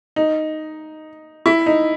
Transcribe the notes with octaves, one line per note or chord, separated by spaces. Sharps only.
D#4
E4
D#4